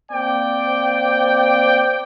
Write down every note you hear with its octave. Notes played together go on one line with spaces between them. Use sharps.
A#3 C4 D5 G5